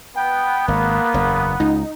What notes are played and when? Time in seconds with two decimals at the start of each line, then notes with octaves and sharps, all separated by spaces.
0.16 B3 G5
0.68 G#1 A#3
1.14 F#1 E2
1.60 C#2 D#4